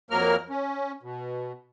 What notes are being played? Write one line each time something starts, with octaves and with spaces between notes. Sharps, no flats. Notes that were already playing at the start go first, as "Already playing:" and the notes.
F2 F#3 A#3 A#4 F6
C#4
B2